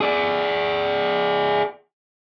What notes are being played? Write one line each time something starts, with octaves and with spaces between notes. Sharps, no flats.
G#4 D5